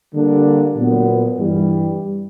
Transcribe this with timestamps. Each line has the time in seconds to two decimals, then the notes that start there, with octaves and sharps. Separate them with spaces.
0.13 D3 G3 A#3 D4
0.75 A#2 F#3 B3
1.38 G2 E3 G3